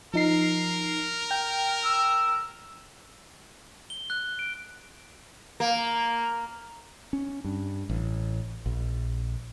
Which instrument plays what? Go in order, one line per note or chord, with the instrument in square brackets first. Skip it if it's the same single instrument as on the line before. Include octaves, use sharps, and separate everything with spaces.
[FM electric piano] F3 D#4 C7 [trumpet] A#4
[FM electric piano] G5
[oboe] E6
[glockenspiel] G7
F#6
D7
[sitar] A#3
[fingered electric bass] C#4
G2
A1
A#1